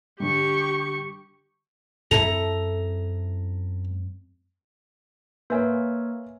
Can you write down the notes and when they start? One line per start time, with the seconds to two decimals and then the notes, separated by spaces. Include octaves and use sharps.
0.20 D3 G3 G4 C#6
2.11 F#2 C4 E4 A4 A#5
5.50 A#3 A#4 B4 C#5 E5 G#5